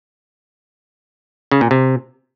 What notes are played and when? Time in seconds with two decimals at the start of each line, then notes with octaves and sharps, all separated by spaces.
1.52 C#3
1.61 A#2
1.71 C3